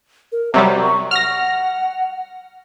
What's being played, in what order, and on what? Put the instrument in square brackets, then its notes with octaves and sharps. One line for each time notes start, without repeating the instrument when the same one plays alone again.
[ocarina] A#4
[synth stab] C3 F#3 G3 [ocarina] A#5
[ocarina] C#6
[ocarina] F#5 [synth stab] F6 A#6